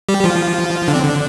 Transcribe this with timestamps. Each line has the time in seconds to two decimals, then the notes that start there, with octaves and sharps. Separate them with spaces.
0.09 G3 G4
0.24 F3 F4
0.88 D3 D4
0.95 C4
1.03 D3 D4